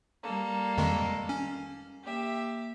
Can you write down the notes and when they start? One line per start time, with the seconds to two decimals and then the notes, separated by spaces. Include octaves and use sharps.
0.23 G3 A#3 A4
0.77 F2 D#3 G#3
1.29 C#4
2.05 A#3 G4 E5